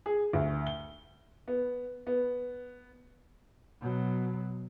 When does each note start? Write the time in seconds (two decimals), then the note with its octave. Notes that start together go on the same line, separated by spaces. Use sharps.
0.06 G#4
0.33 D2
0.67 G7
1.48 B3
2.07 B3
3.81 B2 F#3